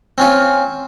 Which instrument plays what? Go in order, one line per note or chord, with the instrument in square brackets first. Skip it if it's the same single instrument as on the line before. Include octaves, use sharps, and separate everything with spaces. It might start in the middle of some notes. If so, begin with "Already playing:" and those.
[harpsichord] C4 C#4 F4